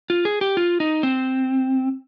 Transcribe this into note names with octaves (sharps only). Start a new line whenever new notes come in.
F4
G#4
G4
F4
D#4
C4